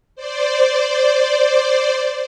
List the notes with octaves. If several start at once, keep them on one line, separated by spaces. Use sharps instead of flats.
C5 D5